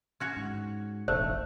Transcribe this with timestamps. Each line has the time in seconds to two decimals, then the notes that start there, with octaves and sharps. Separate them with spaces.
0.20 C#4 F#4 C#5
0.37 G#2
1.08 E1 A1 D#3 A3 C5